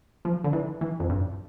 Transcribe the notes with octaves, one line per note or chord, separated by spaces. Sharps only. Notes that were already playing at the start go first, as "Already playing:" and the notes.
F3
D3
E3
E3
F2
G2